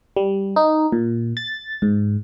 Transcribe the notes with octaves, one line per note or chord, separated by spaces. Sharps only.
G3
D#4
A#2
A6
G#2